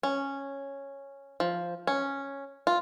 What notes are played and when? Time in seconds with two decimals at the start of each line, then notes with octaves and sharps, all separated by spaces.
0.03 C#4
1.40 F3
1.87 C#4
2.67 F4